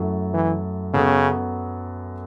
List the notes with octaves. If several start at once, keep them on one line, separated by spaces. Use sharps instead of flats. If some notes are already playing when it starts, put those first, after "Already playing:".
Already playing: F#2 F#3 A3 E4 A4
E3
F#2 C#3 F#3 B3 A4